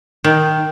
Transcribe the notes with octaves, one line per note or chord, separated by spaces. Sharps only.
D#3